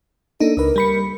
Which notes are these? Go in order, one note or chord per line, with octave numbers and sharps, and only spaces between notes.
A#3 D4 D#4 A4
C#2 A#4 B4
G3 B5 C#7